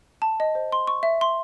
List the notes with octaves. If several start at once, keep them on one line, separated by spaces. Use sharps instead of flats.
A5
D#5
C5
C6
C#6
E5
C6